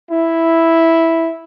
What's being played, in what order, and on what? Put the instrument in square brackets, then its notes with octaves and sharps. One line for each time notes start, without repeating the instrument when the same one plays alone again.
[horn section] E4